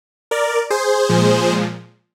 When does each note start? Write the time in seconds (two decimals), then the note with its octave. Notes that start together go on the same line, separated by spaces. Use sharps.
0.31 A#4 D5
0.70 G#4 C5
1.09 A#2 F3 G#3